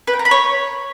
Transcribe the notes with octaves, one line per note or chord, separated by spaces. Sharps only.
B4
G5
A#5
B5
C#5